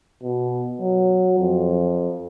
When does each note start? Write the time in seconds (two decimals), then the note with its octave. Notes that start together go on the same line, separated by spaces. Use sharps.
0.23 B2
0.81 F#3
1.40 F2